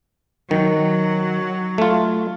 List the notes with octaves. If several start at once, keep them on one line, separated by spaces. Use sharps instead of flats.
D#3 F#3
A3 F4